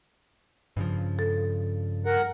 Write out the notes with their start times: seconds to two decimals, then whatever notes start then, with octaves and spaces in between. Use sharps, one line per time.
0.77 G2 C#3 F3
1.19 A4
2.06 A#4 F#5